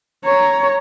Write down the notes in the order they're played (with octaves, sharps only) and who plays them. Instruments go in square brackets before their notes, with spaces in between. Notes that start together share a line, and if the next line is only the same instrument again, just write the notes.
[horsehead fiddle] C#5 A#5